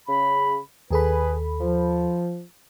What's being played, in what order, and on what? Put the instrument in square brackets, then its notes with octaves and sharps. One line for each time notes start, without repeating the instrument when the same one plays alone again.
[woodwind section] C#3 B5
[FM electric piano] D#2 A4 B5 [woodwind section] G#4 B4
[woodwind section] F3